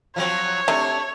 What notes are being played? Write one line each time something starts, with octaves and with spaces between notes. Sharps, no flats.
F3 F#3 C4 C#5
C3 A3 D4